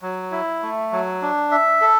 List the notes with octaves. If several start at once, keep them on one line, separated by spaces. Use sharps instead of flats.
F#3
E4
A3
F#3
D4
E5
A4